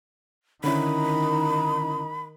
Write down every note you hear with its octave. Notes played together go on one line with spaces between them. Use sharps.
D3 D#3 C#4 D#4 E4 B5